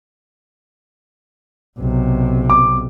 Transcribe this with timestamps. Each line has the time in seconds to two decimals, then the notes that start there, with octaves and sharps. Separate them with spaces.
1.79 B1 C3
2.50 D6